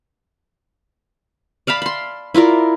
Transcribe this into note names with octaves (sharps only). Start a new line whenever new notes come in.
D5 F5 A5 B5
B5 C6
E4 F4 A#4 D5